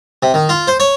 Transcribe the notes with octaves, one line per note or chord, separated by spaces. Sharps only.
C3
D#3
F4
C5
C#5